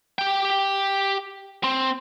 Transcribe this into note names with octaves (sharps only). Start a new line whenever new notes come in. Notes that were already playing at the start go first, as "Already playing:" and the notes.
G4 G5
C4